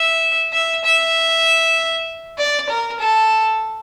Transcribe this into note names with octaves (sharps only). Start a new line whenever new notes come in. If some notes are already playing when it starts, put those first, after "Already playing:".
Already playing: E5
E5
E5
D5
A#4
A4